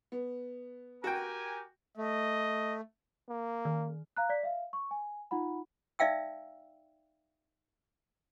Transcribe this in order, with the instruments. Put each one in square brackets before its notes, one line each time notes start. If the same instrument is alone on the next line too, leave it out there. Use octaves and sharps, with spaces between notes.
[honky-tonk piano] B3
[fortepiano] F#4 G5 [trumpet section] G4 A#4 G#5
[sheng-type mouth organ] A3 [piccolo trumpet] D#5
[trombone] A#3
[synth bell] D#3
[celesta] F5 A#5 F#6
D5 B6
E5 F5
C#6
G#5
D#4 F4 F#5 B5
[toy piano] D#4 D5 E5 F5 G5 E6